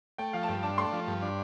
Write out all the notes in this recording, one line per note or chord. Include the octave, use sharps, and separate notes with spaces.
A3 G5
F3 F5
A5
G2 G5
D4 A5
A3 C6
F3
G2
D4